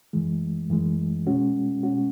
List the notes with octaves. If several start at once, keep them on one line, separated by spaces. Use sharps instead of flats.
F#2 E3 G#3
F#2 E3 G#3
B2 G#3 C#4 F#4
B2 G#3 C#4 F#4